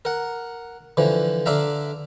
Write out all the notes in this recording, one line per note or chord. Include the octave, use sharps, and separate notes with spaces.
A#4 F#5
D3 E3 F3
D3 D4 E5 F5 A#5